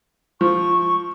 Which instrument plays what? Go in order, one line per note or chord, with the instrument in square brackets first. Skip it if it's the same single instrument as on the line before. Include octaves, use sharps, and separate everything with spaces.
[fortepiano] F3 [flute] C#6